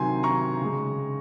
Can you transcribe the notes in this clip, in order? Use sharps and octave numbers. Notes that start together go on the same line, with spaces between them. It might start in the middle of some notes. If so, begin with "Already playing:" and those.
Already playing: C3 D#3 F#3 G#5 C6
A#5 C#6
C#3 G#3